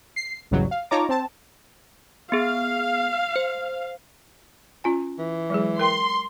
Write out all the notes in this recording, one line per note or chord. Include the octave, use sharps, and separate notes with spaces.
C7
A#1 E2 G#2 C#3 F#3 G3
F5
D#4 F4 C#5 A5 A#5 D6
C4 A5
B3 G#4 F5
C5
C#4 F4 G#5
E3
F#3 G#3 G#4
A#4 G5 C6